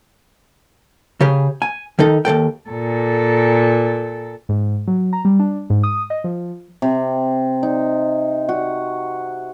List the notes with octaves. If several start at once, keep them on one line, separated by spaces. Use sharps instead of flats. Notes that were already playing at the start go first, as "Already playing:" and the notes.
C#3 G4 G#4
G#5
D#3 D#4 A4
D#2 C#3 A4 G5
A#2 A4
G#2
F#3
A#5
G3
D4
G#2
D#6
D#5
F3
C3
D#4
F#4